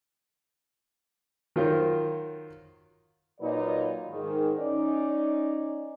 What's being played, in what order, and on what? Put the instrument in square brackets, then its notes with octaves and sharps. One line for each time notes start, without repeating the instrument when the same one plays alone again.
[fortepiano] D#3 F#3 F4 A#4 C5 C#5
[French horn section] A#2 F#3 D#4 F4 B4 D5
G#2 D#3
C#4 D#4 D5